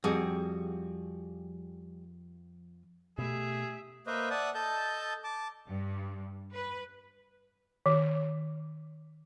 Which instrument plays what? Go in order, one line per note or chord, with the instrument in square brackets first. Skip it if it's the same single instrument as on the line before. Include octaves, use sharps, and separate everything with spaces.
[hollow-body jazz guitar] F2 [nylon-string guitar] G3 F#4 G#4
[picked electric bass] B2 A3 [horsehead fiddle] G4 E5 [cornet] G#4
[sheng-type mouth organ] A#3 B4 C5 D#5 E5
D5 E5 F#5 A5 D#6
A4 D#5 A5 G6
A5 D6
[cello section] G2
B4
[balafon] D#3